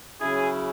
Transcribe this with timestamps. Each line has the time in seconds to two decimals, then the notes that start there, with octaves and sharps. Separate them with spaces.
0.21 C#3 F#3 C#4 E4 G#4